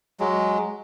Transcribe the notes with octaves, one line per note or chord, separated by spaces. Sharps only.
F#3 G#3